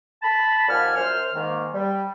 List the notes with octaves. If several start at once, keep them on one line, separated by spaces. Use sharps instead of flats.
A5 B5
D#2 F3 D5 F#5 G#5 F6
F#2 C5 F6
G#2 D#3 A#3
G3